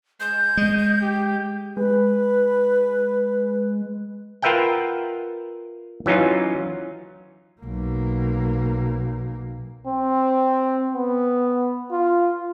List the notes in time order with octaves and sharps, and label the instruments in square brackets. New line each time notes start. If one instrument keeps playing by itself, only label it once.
[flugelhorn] G#3 [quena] G6
[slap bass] G#3 [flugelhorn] D#5
[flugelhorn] G4
[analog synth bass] G#3 [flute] B4
[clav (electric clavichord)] F4 A#4 B4 E5 F#5 G5
E3 F#3 C#4 D#4 F4
[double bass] B1 A#3
[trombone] C4
B3
F4